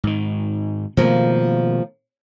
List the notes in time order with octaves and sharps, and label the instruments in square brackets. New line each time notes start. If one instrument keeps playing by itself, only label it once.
[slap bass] G#2 D#3
[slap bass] B2 D#3 A3 [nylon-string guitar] F3 A#3